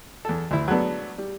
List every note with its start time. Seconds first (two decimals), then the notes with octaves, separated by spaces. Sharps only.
0.25 E2 A4
0.51 D2 E4
0.68 F#3 G#3 A3 B3 D4
1.18 G3